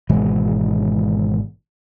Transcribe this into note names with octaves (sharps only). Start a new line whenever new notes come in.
G#1 B2 E3 G#3